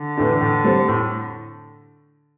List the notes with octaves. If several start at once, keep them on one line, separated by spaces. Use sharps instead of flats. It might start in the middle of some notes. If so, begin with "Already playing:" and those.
Already playing: D3
A2 E3 A3 D4
A2
G3 C4 A4 C5
A2